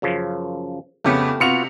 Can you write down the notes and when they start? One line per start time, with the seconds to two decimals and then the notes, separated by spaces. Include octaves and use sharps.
0.02 F#2 C#3 F3
1.04 F2 C#3 A3 B3 G4
1.40 C3 B3 F4 F#4 C#7 F7